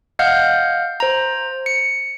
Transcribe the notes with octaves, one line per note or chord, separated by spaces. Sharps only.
D#5 F5 F#5 F6 G6
C5 A#5
C#7